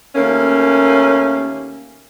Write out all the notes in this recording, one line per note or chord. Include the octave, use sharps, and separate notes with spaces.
D#2 A3 A#3 C#4